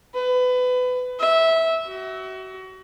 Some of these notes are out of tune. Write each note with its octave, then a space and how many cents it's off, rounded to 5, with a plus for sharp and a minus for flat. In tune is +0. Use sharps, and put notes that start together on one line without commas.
B4 +25
E5 -15
F#4 +30